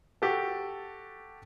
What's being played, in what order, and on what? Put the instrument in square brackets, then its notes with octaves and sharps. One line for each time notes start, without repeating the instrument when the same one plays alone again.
[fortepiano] F#4 G4 A4